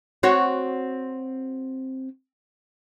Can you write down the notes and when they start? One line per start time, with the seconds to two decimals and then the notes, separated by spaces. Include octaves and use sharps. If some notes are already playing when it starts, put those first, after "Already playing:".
0.23 C4 F#4 C#5